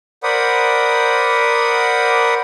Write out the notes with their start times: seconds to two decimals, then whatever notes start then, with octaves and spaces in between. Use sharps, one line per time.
0.23 A#4 C5 D5 F#5 B5 D#6